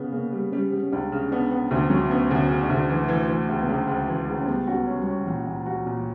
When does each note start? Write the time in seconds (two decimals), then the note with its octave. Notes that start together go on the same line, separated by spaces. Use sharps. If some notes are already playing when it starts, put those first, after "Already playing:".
Already playing: C#3 B3
0.12 C#3 A#3
0.33 G3
0.52 G3 C#4
0.72 G3
0.83 C#4
0.92 C#2 D4
1.12 C#3
1.32 B3 D4
1.51 B3
1.71 D2 D4
1.90 F#3
2.10 B3 C#4
2.31 D2
2.37 C#4
2.49 C#3
2.63 D4
2.69 D2
2.80 D4
2.90 E3
3.08 E3
3.29 E3
3.49 C#2
3.62 B3
3.68 C#2 C#4
3.87 C#2
4.08 E3
4.28 C#2
4.40 C#4
4.47 G3 B3
4.67 C#4 F#4
4.73 B3
4.86 C#4
4.99 G3
5.07 C#4
5.26 A#2 E3
5.46 A#2
5.66 F#4
5.86 A#2